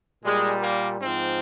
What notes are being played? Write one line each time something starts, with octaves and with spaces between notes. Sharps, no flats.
A#2 G3 G#3
A#3
G#2 F3 C4